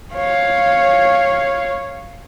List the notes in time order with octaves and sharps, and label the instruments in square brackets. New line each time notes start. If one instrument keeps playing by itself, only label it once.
[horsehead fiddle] C#5 F5